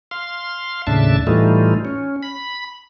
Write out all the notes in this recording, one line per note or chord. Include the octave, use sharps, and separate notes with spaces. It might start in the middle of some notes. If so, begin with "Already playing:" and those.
F5 C6
D#2 A2 C#3 D4 E5 A5
A2 E3 G3 A3 D#4 F4
C#4
B5